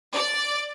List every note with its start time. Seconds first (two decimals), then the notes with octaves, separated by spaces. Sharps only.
0.14 D5